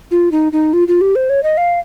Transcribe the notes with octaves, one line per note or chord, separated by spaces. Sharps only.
F4
D#4
D#4
F4
F4
G4
C5
C#5
D#5
F5